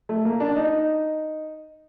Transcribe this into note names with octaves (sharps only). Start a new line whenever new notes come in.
A3
A#3
D4
D#4